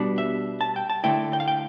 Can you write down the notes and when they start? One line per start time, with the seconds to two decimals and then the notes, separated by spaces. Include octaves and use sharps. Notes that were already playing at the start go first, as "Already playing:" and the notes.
Already playing: B2 G3 B3 D4
0.18 E5
0.61 A5
0.76 G5
0.90 A5
1.04 D3 A3 E4 G5
1.33 G5
1.40 F5
1.48 G5